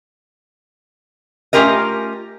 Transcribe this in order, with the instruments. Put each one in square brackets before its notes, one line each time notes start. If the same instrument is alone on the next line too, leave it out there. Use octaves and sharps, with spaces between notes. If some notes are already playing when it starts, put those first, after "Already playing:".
[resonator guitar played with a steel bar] A3 C#4 F4 G4 A#4 D#5